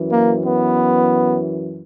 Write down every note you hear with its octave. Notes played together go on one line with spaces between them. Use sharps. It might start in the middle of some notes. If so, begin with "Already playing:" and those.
Already playing: F#2 E3
A#3
B3